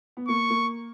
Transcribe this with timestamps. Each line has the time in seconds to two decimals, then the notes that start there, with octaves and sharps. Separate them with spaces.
0.17 B3
0.28 A#3 C#6
0.50 A#3